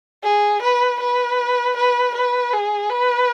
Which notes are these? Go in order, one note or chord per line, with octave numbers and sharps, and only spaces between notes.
G#4
B4
B4
B4
B4
G#4
B4